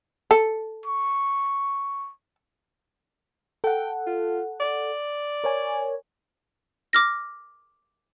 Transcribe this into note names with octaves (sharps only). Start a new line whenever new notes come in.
A4
C#6
A4 F#5 G5
F4
D5
A#4 C#5 G#5
D6 F6 A#6